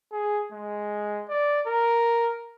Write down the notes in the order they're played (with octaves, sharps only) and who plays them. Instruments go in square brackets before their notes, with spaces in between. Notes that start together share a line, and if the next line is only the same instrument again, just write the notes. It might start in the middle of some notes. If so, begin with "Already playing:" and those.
[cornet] G#4
G#3
D5
A#4